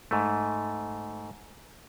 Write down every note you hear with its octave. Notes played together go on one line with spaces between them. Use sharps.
G#2 A3